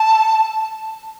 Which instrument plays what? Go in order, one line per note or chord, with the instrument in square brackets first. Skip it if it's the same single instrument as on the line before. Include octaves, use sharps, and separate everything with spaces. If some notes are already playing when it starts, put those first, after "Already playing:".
Already playing: [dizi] A5